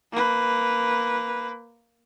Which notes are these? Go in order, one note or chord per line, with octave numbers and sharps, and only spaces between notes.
A#3 B4